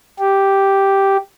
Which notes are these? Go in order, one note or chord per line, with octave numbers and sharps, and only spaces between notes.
G4